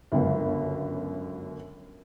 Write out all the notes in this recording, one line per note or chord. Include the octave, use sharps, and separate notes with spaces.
G1 C#2 F#2